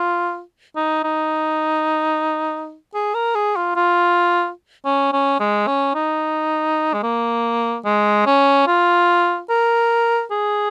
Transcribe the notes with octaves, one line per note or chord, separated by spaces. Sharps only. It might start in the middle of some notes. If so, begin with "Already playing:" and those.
Already playing: F4
D#4
D#4
G#4
A#4
G#4
F4
F4
C#4
C#4
G#3
C#4
D#4
G#3
A#3
G#3
C#4
F4
A#4
G#4